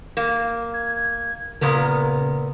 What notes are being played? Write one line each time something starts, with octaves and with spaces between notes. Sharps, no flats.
A#3
G#6
A#2 C#3 B3 A#4